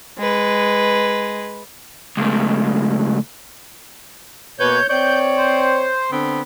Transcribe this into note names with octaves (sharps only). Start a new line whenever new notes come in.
G#3 B4
C#2 A2
B2 A#3 B4 C#5 G6
C4 C#5 D5 G6
C5
D3 B3 C4